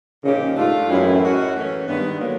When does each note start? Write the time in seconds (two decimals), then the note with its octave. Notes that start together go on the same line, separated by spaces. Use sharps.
0.23 A#2 C#3 F3 A#3 D#4 G4
0.56 G#2 A3 D4 F4
0.89 F#2 A2 E3 G#3 C4 E4
1.21 G#3 C#4 F#4 A#4
1.54 E3 A3 C#4
1.87 G2 D#3 G#3 B3
2.19 D3 F#3 A#3